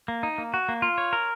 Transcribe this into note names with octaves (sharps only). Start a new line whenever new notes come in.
A#3
D#4
A#3
F#4
A#3
F4
C#5
A#4